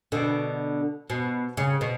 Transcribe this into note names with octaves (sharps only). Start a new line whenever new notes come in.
B2 D3
B2
C#3
B2